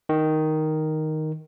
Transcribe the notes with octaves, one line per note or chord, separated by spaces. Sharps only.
D#3